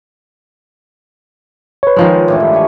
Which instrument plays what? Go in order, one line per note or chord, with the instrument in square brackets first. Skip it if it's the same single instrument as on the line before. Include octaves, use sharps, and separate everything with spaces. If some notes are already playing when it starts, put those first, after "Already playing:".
[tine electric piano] B4 C#5
[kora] D#3 F3 G#3
[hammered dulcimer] A2 E3 D4
G2
A4 C#5 G#5